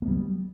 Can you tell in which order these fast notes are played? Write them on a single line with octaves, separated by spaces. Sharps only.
A#3 B3 G3 F#3